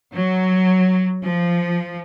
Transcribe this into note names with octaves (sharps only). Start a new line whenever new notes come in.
F#3
F3